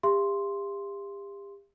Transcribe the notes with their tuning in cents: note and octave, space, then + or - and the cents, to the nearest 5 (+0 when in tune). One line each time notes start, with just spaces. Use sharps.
G4 +35 E5 +45 C6 +0